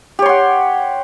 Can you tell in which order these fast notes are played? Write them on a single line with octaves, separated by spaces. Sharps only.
G4 C#5 C6 F#5